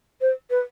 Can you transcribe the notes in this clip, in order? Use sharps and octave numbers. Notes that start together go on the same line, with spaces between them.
C5
B4